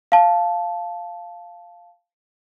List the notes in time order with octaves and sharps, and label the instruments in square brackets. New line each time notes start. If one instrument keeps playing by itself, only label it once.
[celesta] F5 A5